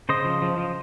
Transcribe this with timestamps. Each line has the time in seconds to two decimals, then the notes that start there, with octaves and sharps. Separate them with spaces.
0.09 C#3 C5 D#5
0.25 F3
0.42 F3
0.58 F3